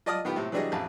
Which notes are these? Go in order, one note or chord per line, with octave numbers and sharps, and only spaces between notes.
F4 D5 D#5 A5 D#6 F6
D#3 B3 F4 G4
A2 C3
E3 F#3 G3 D4 G#4 D#5
A1 F2 A5